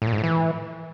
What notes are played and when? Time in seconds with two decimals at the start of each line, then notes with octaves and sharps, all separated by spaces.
0.02 A2
0.07 A#2
0.13 G#2
0.18 A2
0.24 E3